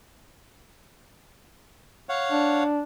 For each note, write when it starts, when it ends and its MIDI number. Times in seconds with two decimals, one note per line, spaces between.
2.09 2.64 73
2.09 2.64 77
2.09 2.64 78
2.31 2.83 62